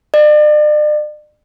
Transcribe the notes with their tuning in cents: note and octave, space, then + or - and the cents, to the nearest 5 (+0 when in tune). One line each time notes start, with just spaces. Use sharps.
D5 +40